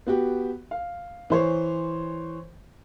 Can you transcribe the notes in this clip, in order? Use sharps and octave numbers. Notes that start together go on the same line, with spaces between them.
B3 F#4 G4
F5
E3 C5 C#5